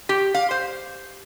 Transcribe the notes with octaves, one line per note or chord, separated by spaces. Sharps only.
G4
F5
C5